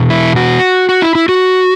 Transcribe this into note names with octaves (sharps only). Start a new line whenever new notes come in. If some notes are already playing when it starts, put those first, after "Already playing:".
Already playing: E2 B2
E4
F#4
F#4
E4
E4
F#4